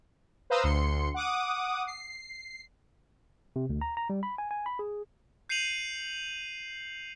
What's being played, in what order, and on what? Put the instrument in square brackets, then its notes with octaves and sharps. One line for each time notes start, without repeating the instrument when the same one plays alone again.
[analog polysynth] B4 C5 F5 A#5 D#6 E6
D2 C6 C#7
F#5 D6 D#6
C7
[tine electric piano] C3
D2
A#5
A#5
G3
B5
G#5
G#5
B5
G#4
[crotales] G6 C7 C#7 D#7 F7 F#7